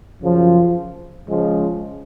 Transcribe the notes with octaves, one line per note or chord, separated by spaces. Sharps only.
F#2 C#3 F3
C#3 F3 G#3